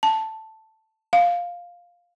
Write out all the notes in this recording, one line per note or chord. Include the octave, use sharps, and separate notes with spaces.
A5
F5